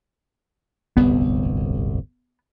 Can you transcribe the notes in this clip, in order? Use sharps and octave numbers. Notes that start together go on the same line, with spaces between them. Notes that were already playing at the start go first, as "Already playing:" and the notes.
D1 G1 C2 B3